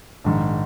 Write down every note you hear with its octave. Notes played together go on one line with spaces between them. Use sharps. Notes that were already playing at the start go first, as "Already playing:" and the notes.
A#1 G#2 D#3